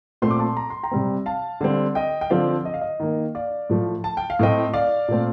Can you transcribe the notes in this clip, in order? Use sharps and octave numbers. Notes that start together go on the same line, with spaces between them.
A#2 A3 C4 C6
D6
A5 C6
A#5
C6
G5 A#5
C3 G3 C4
F5 A5
D3 G3 C4
D#5 G5
G5
D3 F3 C4 D5 F5
D#5
F5
D#5
D#3 A#3
D5 F5
A2 F3 A3
A5
G5
F5
A2 A3 C4 D#5 G5
D5 F5
A#2 A3 C4